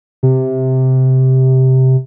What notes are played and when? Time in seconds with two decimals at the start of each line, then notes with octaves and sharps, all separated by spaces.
0.23 C3